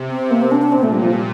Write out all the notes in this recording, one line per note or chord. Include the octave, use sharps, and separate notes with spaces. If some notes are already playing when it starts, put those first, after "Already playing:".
Already playing: C3
C4
A#3
C4
D4
D4
A#2 C4
A3
G3
F3
G3